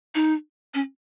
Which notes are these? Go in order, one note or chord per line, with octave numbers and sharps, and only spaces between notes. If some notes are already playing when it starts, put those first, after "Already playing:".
D#4
C#4